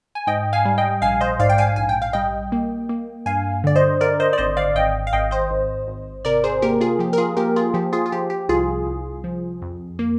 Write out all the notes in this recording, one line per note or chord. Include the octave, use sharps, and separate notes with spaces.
G#5
G#2 D#5 G5
F5 G#5
G3
D#5 G5
A#1 F5 G#5
C5 D#5
G#2 D5 F5
G5
F5 G#5
A#1 G#5
G5
F5
G3 D#5 G5
A#3
A#3
G2 F5 G#5
D3 D5
C5 D#5
D3 A#4 D5
C5 D#5
D5
G#1 C5 D#5
D5 F5
G#1 D#5 G5
F5
G#1 D#5 G5
C5 D#5
G#1
G#1
C3 A#4 D5
G#4 C5
A#3 G4 A#4
F4 G#4
F3 G4
A#4
F4 G#4
A#3 G4 A#4
F4 G#4
F3 G4
F4 G#4
F4
F3 G4
G4
C2 F4 G#4
C2
F3
F2
A#3